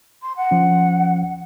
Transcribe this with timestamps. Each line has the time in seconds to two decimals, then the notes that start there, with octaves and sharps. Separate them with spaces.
0.22 C6
0.36 F#5
0.51 F3 C#4